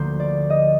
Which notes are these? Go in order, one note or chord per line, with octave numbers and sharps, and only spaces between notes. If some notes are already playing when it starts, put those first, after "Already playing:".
Already playing: D2 D3 F3 A#3 C5
D5
D#5